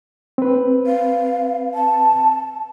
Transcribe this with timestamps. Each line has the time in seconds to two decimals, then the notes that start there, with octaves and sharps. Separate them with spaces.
0.38 C4 B4
0.86 F5
1.74 A5